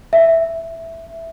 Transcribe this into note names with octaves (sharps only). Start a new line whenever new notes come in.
E5